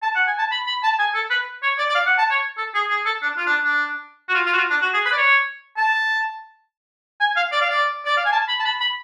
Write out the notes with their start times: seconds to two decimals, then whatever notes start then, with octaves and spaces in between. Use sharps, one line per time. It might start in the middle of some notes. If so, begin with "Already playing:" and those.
0.02 A5
0.15 F#5
0.27 G#5
0.39 A5
0.51 B5
0.67 B5
0.83 A5
0.99 G#5
1.14 A4
1.30 B4
1.63 C#5
1.78 D5
1.88 D5
1.95 F5
2.06 F#5
2.18 A5
2.30 C#5
2.58 A4
2.75 G#4
2.90 G#4
3.06 A4
3.22 D4
3.37 F4
3.46 D4
3.64 D4
4.29 F#4
4.34 F4
4.46 F4
4.53 F#4
4.58 F4
4.70 D4
4.82 F#4
4.94 G#4
5.05 B4
5.12 D5
5.17 C#5
5.77 A5
7.20 G#5
7.37 F5
7.52 D5
7.61 F5
7.70 D5
8.05 D5
8.17 F5
8.25 G#5
8.32 A5
8.48 B5
8.59 A5
8.65 B5
8.81 B5